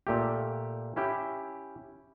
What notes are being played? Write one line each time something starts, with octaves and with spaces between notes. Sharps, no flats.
A#2 A3 G4
C#4 E4 G4